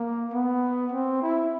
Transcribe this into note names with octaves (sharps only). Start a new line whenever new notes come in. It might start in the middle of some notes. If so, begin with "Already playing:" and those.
Already playing: A#3
B3
C4
E4